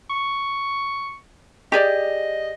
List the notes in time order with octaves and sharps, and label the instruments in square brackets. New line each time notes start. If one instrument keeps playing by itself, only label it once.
[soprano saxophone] C#6
[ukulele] G4 G#4 D5 [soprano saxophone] D#5